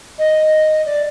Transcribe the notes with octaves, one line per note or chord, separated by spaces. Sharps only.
D#5
D5